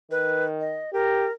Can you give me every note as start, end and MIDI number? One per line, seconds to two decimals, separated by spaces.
0.11 0.81 51
0.11 0.45 71
0.60 0.90 75
0.93 1.28 67
0.93 1.32 70